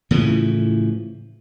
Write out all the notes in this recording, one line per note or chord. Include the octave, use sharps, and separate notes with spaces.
A2 C#3 E3 F3